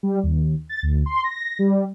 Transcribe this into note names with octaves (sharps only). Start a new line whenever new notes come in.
G3
D#2
A6
D2
C6
A#6
G3